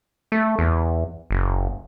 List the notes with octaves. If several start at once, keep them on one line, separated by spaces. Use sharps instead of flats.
A3
E2
F#1